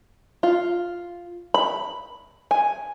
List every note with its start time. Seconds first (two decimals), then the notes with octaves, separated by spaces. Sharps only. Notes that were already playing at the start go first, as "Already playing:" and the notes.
0.43 F4
1.54 B5
2.51 G#5